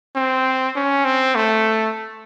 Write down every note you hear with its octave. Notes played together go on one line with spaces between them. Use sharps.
C4
C#4
C4
A3